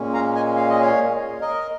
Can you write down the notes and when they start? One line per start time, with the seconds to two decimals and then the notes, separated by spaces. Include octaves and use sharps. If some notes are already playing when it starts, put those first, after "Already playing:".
Already playing: A#2 G#3 C#4
0.14 F5 A#5
0.35 D#5 G#5
0.56 F5
0.69 D#5
0.81 C#5 F5
1.41 A#4 D#5